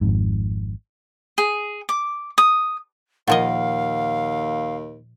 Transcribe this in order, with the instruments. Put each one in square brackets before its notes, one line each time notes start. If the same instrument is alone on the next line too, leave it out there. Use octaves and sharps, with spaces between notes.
[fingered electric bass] G#1 F2 G#2
[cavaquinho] G#4
D6
D#6
[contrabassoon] D#2 [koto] A#2 F3 D#5 [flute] F5 [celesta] F#5